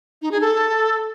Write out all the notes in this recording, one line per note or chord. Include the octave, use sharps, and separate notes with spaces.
D#4
G#4
A4